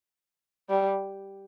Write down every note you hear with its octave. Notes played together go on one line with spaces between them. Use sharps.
G3